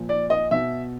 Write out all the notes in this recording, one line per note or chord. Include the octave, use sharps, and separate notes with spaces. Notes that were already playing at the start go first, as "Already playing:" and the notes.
Already playing: A#2 F3
D5
D#5
B2 E5